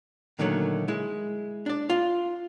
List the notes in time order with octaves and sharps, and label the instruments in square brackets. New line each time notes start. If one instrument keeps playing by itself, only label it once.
[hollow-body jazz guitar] A#2 D3 D#3 F#3 A3
G#3 E4
D4 D5
F4